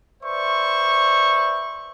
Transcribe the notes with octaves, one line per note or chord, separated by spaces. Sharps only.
B4 C5 D5 E5 C#6